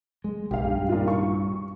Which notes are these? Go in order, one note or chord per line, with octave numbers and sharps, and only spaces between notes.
G#3
B1 G4 F5
G2
A#2 D#3 F4
C#6